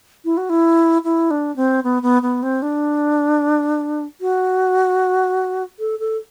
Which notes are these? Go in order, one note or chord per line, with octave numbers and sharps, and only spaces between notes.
E4
F#4
E4
E4
D4
C4
B3
B3
B3
C4
D4
F#4
A4
A4